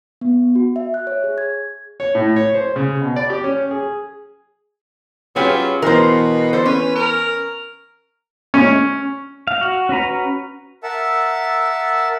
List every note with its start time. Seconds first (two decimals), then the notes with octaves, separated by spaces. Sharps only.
0.21 B3
0.55 F#4
0.76 E5
0.94 F#6
1.07 C#5
1.24 G#4
1.38 G#6
2.00 C#5
2.15 A2
2.36 C#5
2.54 C5
2.76 C#3
3.02 B2
3.16 D5
3.30 G4
3.44 C#4
3.71 G#4
5.36 F#3 C#4 F4 G4 G#4 B4 B6
5.82 B2 E3 B3 A#4 C5
6.53 D3 C5
6.66 C#4 B4
6.95 A#4
8.54 C#4
9.47 F5
9.61 F#4
9.89 C#4 F#4 B4 A#5
10.83 A#4 E5 F#5 A5 E6